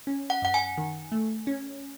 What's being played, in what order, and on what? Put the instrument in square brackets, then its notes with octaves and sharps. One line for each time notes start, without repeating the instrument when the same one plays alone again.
[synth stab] C#4
[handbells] F#5
[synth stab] F#2 [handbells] F#5
[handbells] G#5
[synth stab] D#3
A3
C#4